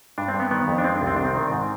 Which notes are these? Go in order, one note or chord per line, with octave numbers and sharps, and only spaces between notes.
G2 D4
C4
G2
B3
D#3 B3
F2
D4
G#3 C4
D4
C2
C4
D#3 D4
C4
D#3
G#2